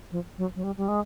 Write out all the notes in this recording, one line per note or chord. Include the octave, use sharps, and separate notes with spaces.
F3
F#3
F#3
G3
G3
G#3